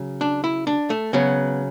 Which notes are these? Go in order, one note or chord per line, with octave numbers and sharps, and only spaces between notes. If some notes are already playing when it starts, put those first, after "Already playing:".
Already playing: C#3 F#3
D4
E4
D4
A3
C#3 F#3 B3